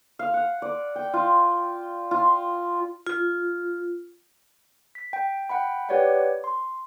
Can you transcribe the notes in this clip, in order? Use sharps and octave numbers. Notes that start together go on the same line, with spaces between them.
F5
F#5
D5
G5
F4
F4
F4
B6
G5
F#5 G5 B5
G4 B4 C#5 D5 F#5 G5
C6